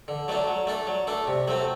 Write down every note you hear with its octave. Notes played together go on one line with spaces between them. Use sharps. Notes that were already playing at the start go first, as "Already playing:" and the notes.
D3
F#3 A3 D4
F#3
A3 D4 A4
F#3
A3 D4 A4
C3
F#3 A3 C4